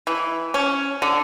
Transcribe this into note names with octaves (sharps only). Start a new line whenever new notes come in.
E3
C#4
D3